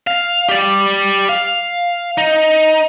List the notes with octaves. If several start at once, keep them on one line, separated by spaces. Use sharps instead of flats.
F5
G4 D5
F5
D#4